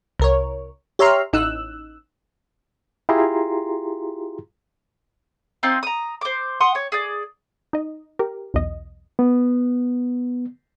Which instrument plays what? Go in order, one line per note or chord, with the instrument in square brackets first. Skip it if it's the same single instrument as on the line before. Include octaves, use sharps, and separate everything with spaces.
[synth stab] C2 A#4 C#5
G4 C#5 E5 A#5 C6 F6
A1 D#4 E6 F#6
[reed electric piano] E4 F4 G4 G#4 A#5 C6
[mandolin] C4 D#4 F4
A#5 D#6
C5 D6
F#5 C6 D#6
C#5
G#4 D5
[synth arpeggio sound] D#4 D#5
G4 A#4
B1 E2 D#5
[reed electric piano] B3